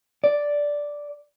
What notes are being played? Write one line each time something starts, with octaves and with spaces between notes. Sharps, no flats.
D5